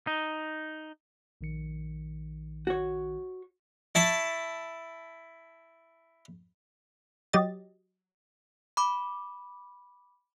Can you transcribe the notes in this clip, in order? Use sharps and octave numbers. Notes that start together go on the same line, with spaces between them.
D#4
A#1 D#3 C#7
F#4 C#5
E4 A5 C#6
F#3 G4 D#5 A6
B5 D6